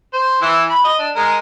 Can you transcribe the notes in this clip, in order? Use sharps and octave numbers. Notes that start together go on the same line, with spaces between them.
C5
E3 E4
B5
D#5
D4
G#3 A#4